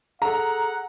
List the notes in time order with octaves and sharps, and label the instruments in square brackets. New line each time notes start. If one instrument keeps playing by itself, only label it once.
[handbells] G#4 A4 [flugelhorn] F#5 [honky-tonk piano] A#5